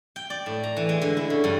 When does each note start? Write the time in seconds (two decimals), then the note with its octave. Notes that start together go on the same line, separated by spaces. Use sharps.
0.16 G5
0.30 D5
0.46 A2
0.63 A#5
0.77 E3
0.89 G#3
1.02 D3
1.17 E4
1.30 C#3
1.44 G2